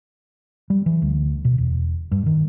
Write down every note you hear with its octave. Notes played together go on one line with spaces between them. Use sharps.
G3
E3
D2
B2
E1
G2
D#3